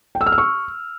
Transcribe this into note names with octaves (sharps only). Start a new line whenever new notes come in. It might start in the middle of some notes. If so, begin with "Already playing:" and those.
G5
E6
F6
E6
C#6